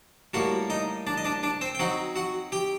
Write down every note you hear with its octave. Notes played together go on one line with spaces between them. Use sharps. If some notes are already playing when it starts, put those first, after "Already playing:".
A2 G3 A#3 F#4 F#5
D#4 D#5
D4 D5
D#5
D4 D5
D4 D5
C4 C5
G5
F#3 C4 D#4 F#4 F#5
F#4 F#5
G4 G5